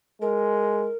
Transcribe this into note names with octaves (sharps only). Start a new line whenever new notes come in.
G#3 A#4